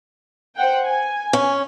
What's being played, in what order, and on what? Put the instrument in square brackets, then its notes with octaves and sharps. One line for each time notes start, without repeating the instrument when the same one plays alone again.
[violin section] C5 F#5 G5
G#5
[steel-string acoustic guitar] C#4